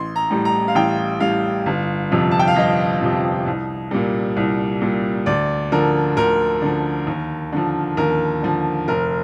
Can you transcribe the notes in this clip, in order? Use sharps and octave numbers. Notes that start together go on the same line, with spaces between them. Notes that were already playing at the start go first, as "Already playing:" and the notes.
Already playing: A1 C6
A#5
A2 G3
A#5
F5
A1 G5
A2 G3 F5
G1
F2 C3 F3
A5
G5
F5
G1 D#5
F2 C3 F3
C2
A#2 G3
C2
A#2 G3
D2 D5
D3 F3 A#4
D2 A#4
D3 F3
D#2
D3 F3
D#2 A#4
D3 F3
F1 A#4